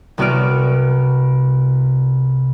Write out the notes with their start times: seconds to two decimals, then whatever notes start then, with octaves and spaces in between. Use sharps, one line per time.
0.18 C2 B3 F#4 D5 F6 D7